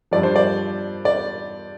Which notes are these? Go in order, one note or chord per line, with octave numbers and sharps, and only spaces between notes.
G2 F3 D5
C5
D5
D5